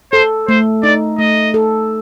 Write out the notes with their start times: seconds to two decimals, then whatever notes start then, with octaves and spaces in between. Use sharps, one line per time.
0.12 A4 C5
0.48 A3 C5
0.83 D#4 D5
1.18 A3 D#5
1.54 A4